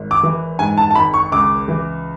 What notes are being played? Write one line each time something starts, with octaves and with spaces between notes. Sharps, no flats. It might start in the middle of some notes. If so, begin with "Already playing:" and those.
Already playing: G#1
D6
E3
G#2 G#5
A5
A5
G#1 B5
C#6
C#2 D6
E3